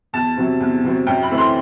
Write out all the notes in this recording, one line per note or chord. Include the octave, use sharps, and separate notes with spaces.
E2 A5
C3 F#3 C4
E2
C3 F#3 C4
F#2 G5
B5
E3 A3 C4
C6